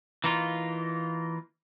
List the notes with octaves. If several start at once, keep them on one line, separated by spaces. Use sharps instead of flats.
E3 A#3 D#4 F4